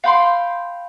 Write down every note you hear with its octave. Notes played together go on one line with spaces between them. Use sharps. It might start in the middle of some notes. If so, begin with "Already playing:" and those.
F5 G5 B5 C6